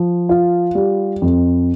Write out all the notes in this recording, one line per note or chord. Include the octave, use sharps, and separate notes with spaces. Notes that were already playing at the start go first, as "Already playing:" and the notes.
Already playing: F3
F4
G3
F2